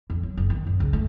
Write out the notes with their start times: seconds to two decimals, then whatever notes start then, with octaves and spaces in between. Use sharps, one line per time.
0.10 F2
0.23 F#3
0.37 F#1
0.50 D#3
0.67 F#2
0.80 C#2
0.93 A3